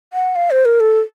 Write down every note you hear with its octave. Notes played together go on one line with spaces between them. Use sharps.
F#5
F5
C5
A#4
A4